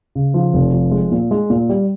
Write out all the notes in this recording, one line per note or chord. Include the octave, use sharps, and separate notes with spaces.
C#3
F3
F1
F3
G#3
A#2
G#3
A#2
G3